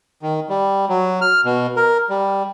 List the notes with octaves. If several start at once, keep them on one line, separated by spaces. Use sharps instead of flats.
D#3
G3
F#3
F6
B2
A#4
G3